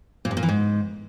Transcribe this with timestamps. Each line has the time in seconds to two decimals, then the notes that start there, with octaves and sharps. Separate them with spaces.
0.25 A#2
0.31 G2
0.37 A#2
0.43 E3
0.49 G#2